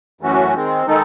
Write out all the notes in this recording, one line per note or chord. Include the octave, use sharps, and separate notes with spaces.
F#2 E3 A3 C#4 F#4
D#3 G#3 C4
D#3 G#3 D#4 A4